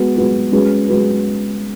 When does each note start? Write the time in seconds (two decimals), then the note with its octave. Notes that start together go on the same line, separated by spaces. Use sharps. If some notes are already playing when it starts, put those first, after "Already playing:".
Already playing: G#3 B3 F#4 B4
0.16 G#3 B3 F#4 B4
0.52 G#3 C#4 F#4 B4
0.89 G#3 C#4 F#4 B4